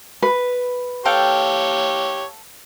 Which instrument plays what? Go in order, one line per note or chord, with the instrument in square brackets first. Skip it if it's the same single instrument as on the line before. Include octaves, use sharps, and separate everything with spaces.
[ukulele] B4
[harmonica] G4 C#5 [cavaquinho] A4 F5 G5